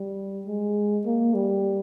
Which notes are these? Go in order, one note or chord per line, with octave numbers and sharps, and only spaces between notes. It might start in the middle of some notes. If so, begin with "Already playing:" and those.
Already playing: G3
G#3
A#3
G3